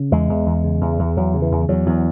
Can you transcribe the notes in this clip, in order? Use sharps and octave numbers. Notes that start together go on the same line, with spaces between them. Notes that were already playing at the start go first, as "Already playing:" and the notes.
Already playing: C#3
E2 G#3
E2
E2
C#3
E2
E2
E2 F#3
C#3
E3
E2
E2 F#3
E2